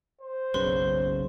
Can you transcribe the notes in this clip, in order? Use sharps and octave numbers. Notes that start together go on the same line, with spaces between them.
C5
F#1 B1 C#3 B4 C6